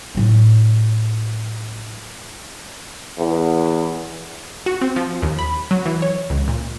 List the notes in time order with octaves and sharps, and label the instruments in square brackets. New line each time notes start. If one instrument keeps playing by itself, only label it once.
[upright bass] A2 F#3
[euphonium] E2
[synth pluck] F#4
C4
F3
D#2
B5
F#3
E3
C#5
C#2
A#2